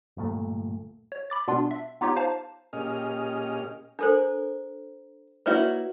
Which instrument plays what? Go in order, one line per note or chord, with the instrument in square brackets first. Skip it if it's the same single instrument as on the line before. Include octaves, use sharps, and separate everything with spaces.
[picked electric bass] D1 G2 A#2 A3
[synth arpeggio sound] C#5
B5 D6 A6
B2 G3 B3 D4 F4
E5
B3 D#4 F4 G4 C#5
C5 F5 A5 A#5
[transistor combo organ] A#2 C#4 G4 G#4 D#5 F6
[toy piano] D4 A4 C5 [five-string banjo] A#4
[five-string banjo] A#3 E4 F#4 [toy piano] B4 C#5 D5